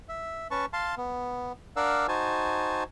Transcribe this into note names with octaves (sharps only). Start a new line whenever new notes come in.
E5
C#4 B4 A5 C#6
F5 A5 C6
B3
D4 A#4 D5 F5 F#5 E6
D#4 F#4 C5 G#5 A5